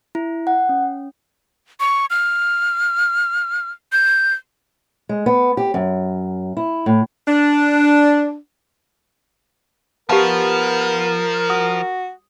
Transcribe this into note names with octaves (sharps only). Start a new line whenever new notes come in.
E4
F#5
C#4
C#6
F6
G6
G#3
B3
G4
F#2
E4
A2
D4
F3 B3 G4 A#4 F5 A5
F#4 D#6